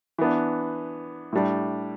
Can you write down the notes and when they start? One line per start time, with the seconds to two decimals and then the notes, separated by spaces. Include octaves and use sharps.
0.18 E3 B3 D4
1.33 A2 G3 D4